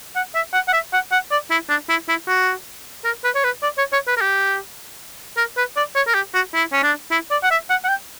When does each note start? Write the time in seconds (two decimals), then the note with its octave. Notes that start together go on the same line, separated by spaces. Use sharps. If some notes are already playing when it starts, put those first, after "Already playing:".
0.16 F#5
0.35 E5
0.53 F#5
0.68 F#5
0.73 E5
0.93 F#5
1.12 F#5
1.31 D5
1.51 E4
1.69 D4
1.89 E4
2.08 E4
2.27 F#4
3.05 A#4
3.24 B4
3.35 C#5
3.44 B4
3.63 D5
3.78 C#5
3.93 C#5
4.07 B4
4.17 A#4
4.21 G4
5.37 A#4
5.57 B4
5.76 D5
5.95 C#5
6.07 A#4
6.14 G4
6.34 F#4
6.54 E4
6.73 C#4
6.83 D4
7.11 E4
7.31 D5
7.43 F#5
7.51 E5
7.70 F#5
7.84 F#5
7.88 G5